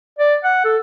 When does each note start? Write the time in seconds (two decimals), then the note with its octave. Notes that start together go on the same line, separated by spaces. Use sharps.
0.19 D5
0.44 F#5
0.64 A4